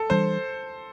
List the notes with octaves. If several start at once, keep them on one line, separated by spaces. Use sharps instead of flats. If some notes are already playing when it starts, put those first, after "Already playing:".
Already playing: A4
E3 G3 D4 C5